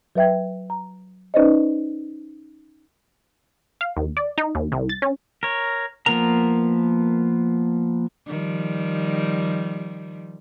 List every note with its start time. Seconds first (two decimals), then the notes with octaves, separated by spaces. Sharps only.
0.16 F#3 B4 E5 G5 G#6
0.70 A#5
1.34 C#4 D#4 B4 C5 D5 D#5
3.81 F5
3.97 D#2
4.17 D5
4.38 D#4
4.55 D#2
4.72 C2
4.89 A6
5.02 C#4
5.43 A#4 C#5
6.06 F3 A#3 B3 A#4 A#5
8.27 D#3 F3 G3